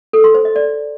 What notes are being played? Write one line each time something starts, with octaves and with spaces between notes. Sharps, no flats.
A4
C6
C5
D#5
D5